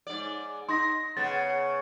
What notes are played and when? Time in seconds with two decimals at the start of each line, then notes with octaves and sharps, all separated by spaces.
0.07 G#2 D5
0.69 D#4 C6 A#6
1.17 C#3 B3 A6